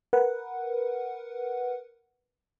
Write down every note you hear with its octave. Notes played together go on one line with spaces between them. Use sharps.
A#4 B4 F#5